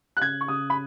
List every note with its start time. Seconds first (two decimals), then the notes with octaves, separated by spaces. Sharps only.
0.17 F#6
0.21 C#3 G#6
0.41 C#6
0.48 C#3 D#6
0.70 B5